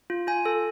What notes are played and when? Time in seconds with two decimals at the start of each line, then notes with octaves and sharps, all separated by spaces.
0.10 F4
0.27 F4 G#5
0.46 A4